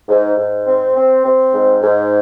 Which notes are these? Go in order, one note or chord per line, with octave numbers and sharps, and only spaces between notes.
G#2
G#2
C4
C4
C4
G#2
G#2